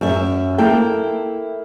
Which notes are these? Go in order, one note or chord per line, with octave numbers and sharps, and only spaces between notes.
F#2 E5
A#3 E4 A4 G5